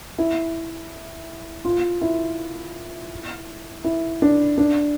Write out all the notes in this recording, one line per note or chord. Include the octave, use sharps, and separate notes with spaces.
E4
F4
E4
E4
D4
D4